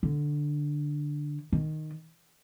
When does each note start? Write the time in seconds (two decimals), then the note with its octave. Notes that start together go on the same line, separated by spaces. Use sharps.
0.03 D3
1.52 D#3